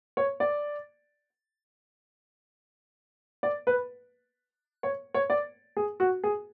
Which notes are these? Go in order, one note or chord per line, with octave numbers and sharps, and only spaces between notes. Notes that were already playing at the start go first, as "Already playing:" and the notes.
C#5
D5
D5
B4
C#5
C#5
D5
G#4
F#4
G#4